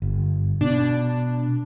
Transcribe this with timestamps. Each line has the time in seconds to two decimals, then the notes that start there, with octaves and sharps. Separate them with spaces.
0.02 G1
0.61 B2 D4